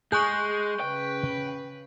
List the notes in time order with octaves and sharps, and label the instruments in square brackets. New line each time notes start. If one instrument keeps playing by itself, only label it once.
[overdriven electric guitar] G#3 [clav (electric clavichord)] G#4 [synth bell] C#6 F#6 G6
[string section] C#3 B4 [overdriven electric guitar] G5